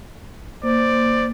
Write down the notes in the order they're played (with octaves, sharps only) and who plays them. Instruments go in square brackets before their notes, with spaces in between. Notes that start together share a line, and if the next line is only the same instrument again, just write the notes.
[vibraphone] A#3 [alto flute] C5 [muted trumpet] D5